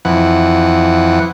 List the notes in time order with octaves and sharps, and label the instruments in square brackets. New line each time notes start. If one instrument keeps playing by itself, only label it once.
[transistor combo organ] F2 E3 F#5